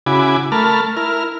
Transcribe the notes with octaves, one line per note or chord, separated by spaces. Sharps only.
C#3 E4 F#4 G#5 B5 D6
A3 A#4 A5 B5 F6
E4 A#4 F6